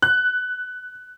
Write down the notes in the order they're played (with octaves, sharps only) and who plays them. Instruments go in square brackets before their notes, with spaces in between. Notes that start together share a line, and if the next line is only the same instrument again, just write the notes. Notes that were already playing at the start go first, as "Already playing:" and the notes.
[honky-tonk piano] F#6